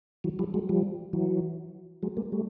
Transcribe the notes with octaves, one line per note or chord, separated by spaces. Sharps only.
E3 F#3
F3 G3
F#3 G#3
F3 G3
E3 F#3
F#3 G#3
G#3 A#3
G3 A3